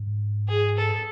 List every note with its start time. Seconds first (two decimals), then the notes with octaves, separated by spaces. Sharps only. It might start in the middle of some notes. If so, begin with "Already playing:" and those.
Already playing: G#2
0.49 G#4
0.77 A4